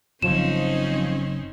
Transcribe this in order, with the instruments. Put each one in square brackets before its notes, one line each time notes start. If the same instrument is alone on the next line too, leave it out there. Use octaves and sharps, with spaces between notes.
[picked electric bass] F#1 [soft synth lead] F3 [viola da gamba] C4 C#4 D#4 [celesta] E7